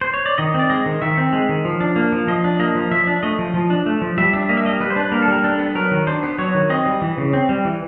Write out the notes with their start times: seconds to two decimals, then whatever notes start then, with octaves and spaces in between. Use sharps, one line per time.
0.01 C5
0.14 C#5
0.26 D5
0.38 D#3 D#5
0.54 C4
0.59 D5
0.70 G#3 D#5
0.86 D#3
1.02 D#3 E5
1.18 C4
1.33 G#3
1.49 D#3
1.65 F3
1.80 D4
1.96 A#3
2.12 F3
2.27 F3 D#5
2.44 D4
2.59 A#3 D#5
2.75 F3
2.91 F3 E5
3.07 D4
3.23 A3 D#5
3.39 F3
3.54 F3
3.70 D4
3.86 A3
4.01 F3
4.18 G3 E5
4.33 D4 E5
4.49 A#3 D#5
4.57 E5
4.65 G3 D#5
4.80 G3 B4
4.90 C5
4.96 D4 B4
5.12 A#3 A#4
5.22 A4
5.28 G3 A#4
5.44 D4 A4
5.59 B3
5.75 F#3 A#4
5.91 D#3
6.07 D4 C5
6.23 B3
6.38 F#3 C#5
6.54 D#3
6.70 C4 D#5
6.86 G3
7.02 E3
7.18 C#3
7.33 C4
7.49 G3
7.65 E3